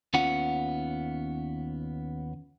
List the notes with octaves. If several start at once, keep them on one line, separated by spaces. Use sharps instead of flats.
D#2 B3 C#4 F4 F#5